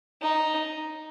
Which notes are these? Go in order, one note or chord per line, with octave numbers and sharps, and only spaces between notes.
D#4